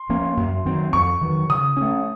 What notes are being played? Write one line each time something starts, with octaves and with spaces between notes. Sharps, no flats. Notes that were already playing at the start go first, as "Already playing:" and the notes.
Already playing: C6
F3 A#3 C#4
F#2
D#3 F#3 C4
F2 C#6
D#3 F#3
C#3 D#6
A3 C#4